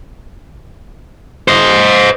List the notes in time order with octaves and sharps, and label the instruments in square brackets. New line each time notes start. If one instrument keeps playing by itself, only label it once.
[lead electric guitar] C5 D#5